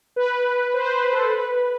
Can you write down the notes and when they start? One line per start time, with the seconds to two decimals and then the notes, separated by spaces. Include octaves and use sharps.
0.16 B4
0.74 C5
0.85 C5
0.94 B4
1.12 A4
1.32 B4
1.51 B4